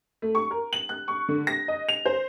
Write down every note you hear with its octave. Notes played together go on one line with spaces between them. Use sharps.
A3
C#6
A#4
F#7
F#6
C#6
D3
A#6
D#5
F7
C5